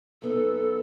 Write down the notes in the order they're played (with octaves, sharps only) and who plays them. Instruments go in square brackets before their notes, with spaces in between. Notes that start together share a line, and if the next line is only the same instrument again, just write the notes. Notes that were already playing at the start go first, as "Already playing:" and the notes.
[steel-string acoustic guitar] F#2 B3 D#4 [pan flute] A4